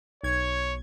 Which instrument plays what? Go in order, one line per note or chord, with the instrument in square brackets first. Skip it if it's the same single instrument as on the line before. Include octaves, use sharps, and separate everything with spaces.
[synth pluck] B1 G#6 [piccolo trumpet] C#5